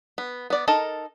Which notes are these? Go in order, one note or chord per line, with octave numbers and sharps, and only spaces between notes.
B3
B3 D5
D#4 A4 A#4 A5